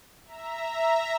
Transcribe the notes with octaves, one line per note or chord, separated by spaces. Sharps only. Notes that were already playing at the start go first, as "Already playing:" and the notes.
E5 A#5